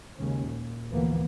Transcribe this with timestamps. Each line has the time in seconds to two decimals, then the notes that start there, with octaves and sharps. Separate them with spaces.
0.17 D#2 C#3 G#3 C#4
0.46 A#2
0.91 D2 G#2 E3 F3 A#3 B3